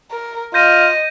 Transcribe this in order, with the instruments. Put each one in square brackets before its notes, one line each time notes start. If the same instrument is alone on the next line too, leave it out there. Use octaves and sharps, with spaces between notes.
[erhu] A#4
[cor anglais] F4 [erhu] D#5 [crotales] G6 A#6 D#7